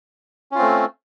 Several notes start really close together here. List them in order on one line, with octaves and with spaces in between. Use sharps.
C#4 F4 C4 A3